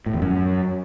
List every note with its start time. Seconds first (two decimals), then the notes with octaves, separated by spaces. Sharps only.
0.06 A2
0.14 E2
0.22 F#2